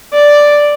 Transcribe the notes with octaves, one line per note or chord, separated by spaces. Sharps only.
D5